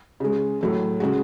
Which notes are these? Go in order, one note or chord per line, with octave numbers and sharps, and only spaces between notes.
C#3 G#3
A2 F#3 A3
C#3 G#3 F#4